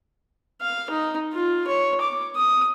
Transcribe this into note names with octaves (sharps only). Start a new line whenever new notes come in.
F5
D#4
F4
C#5
D6
D#6